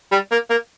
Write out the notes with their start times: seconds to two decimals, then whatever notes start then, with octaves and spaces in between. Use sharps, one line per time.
0.12 G3
0.31 A#3
0.50 A#3